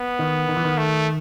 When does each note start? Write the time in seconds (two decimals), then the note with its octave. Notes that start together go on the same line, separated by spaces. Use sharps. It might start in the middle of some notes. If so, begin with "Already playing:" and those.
Already playing: B3
0.19 D#3
0.49 D#3
0.57 E3
0.65 D#3
0.78 A3